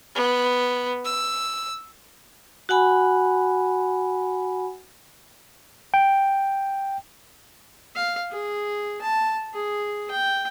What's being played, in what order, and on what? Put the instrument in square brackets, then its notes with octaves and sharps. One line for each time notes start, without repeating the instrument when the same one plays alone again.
[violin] B3
E6
[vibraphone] F#4 F#5 G#5 B5
[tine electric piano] G5
[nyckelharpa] F5
G#4
A5
G#4
G5